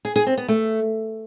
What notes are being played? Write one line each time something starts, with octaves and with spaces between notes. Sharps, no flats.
G#4
G#4
C4
B3
A3